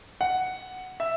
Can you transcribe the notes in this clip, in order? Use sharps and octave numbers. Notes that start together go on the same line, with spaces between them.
F#5
E5